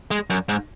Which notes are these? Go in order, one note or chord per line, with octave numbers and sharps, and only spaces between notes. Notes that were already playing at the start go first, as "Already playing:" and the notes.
G#3
F#2
G#2